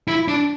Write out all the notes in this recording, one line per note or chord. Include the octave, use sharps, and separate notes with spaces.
E4
D4